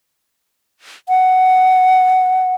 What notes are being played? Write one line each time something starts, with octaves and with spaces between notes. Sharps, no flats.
F#5